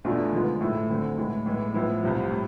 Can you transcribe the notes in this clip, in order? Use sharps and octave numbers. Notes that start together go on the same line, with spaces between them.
E2 B2 A3 D4 F4
D3 F3 G#3 B3 F4
A2 F3 A3 E4
D2 D3 A3 C4
A2 E3 G#3
A2 E3 G#3 B3
A2 F3 B3 E4
C2 C3 F3
A2